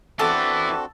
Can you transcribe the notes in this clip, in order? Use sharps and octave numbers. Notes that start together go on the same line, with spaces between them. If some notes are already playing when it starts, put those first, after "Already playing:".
E3 B3 C4 D4 F#4 A4 D6